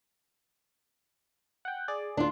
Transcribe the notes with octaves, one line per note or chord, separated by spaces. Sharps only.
F#5 G5
G#4 D5
D2 D4 F4